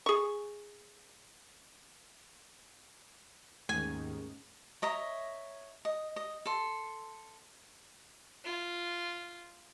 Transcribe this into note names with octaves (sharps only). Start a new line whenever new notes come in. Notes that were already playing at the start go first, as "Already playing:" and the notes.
G#4 C#6
D#2 G#2 D#3 A3 C#4 G#4 G#5
C#5 D#5 E5 A#5
D#5
D#5
A4 C6
F4